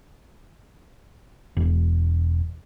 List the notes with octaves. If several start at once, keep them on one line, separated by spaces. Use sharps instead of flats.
E1